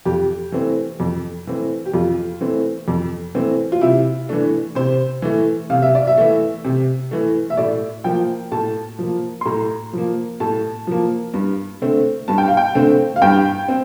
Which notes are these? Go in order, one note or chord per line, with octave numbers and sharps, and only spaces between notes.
F2 G4
E3 A3 C4
F2
E3 A3 C4
G4
F2 F4
E3 A3 C4
F2
E3 A3 C4
F4
C3 E4
E3 A3 D4
C3 C5
E3 A3
C3 F5
E5
D5
E5
E3 A3
C3
E3 A3
E5
A2 D5
F3 A#3 G5
A2 A5
F3 A#3
C6
A2 A#5
F3 A#3
A2 A5
F3 A#3
G2
D3 A3 C4
G2 A5
G5
F5
G5
D3 A3 C4
F5
G2 G5
C4